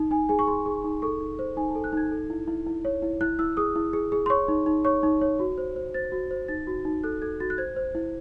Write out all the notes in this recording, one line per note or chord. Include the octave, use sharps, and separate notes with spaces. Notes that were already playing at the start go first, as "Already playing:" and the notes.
Already playing: D#4
D#4 G#5
G#4 G#5
C#6
G#4 C6
G#4
D#4
A4 C#6
D#4
C5
D#4 G#5
A5
A4
F#6
D#4 G#6
A4
E4
E4
E4
C#5
E4
E4 F#6
E4 E6
G#4 D#6
E4
G#4
G#4
C6
C#5 C#6
D#4
D#4
C#5 C#6
D#4
C#5
F#4
C5
C5
C5 A6
F#4
C5
D#4 A6
F#4
D#4
A4 F#6
A4 G#6
F#4 A6
F#6
C5 G#6
C5
E4